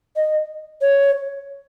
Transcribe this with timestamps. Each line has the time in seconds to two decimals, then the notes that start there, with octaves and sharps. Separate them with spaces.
0.16 D#5
0.81 C#5